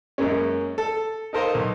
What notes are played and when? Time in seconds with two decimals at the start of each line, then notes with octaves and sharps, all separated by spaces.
0.18 F#2 G#3 A#3 C#4
0.78 A4
1.33 D#4 A4 A#4 C5 D#5 F5
1.54 B1